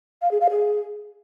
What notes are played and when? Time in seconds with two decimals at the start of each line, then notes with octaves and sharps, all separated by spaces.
0.22 F5
0.31 G#4
0.41 F5
0.50 G#4